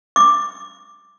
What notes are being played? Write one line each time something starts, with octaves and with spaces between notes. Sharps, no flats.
D6